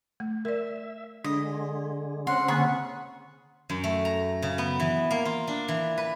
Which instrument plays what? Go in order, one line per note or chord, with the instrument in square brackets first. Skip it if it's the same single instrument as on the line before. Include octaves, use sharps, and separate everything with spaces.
[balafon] A3
[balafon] A#4 D5 [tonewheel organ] E5
[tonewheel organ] D3 G#3 [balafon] D4 [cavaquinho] D#5
[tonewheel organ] C#3 C4 C#4 [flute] F#5 [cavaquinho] C6
[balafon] D3 A#3 [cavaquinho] G#4 B5 C#6
[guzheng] F#2
A3
A#5
C#3
B3
E3
A#3
F4
D4
E3
B4